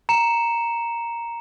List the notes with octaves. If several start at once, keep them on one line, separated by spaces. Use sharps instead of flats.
A#5 C#7 E7